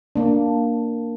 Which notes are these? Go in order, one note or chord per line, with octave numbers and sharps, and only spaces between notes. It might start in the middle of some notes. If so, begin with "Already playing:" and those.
A#3 D4